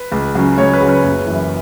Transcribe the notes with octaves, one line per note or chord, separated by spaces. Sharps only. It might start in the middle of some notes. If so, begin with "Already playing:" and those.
Already playing: B4
C#2
C#3 F#3
C#2 C#5
B4
C#3 F#3
B4
F#1
F#2 E3